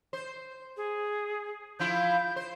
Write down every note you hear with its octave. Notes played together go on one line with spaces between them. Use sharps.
C5
G#4
F3 E4 F4 G6
C5